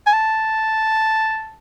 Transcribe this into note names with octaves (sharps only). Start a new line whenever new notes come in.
G#5
A5